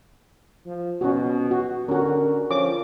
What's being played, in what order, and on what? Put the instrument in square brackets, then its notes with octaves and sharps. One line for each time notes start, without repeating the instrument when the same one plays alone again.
[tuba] F3
[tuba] B2 [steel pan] C#4 F#4
[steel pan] F#4
[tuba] D3 [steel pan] C#4 F#4 [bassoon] A#4
[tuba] F3 [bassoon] C#4 [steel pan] D6